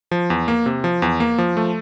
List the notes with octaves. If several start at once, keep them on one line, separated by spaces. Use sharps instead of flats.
F3
E2
A#3
C3
F3
E2
A#3
F3
A3